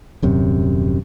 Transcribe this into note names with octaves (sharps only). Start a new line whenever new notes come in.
D#1 F#2 C3